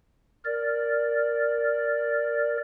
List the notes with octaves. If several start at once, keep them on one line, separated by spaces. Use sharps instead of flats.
A#4 D5